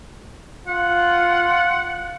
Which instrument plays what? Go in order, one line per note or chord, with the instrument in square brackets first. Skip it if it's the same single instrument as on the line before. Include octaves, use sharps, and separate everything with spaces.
[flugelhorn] F4 [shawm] F#5